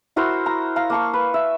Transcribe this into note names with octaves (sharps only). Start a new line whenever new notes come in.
E4 F#4 A#4 C5
A#5
F5 A#5
A#3 A5 C#6
B4
E5